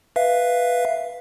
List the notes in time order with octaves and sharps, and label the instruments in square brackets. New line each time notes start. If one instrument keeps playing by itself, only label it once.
[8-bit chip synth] B4 E5 F5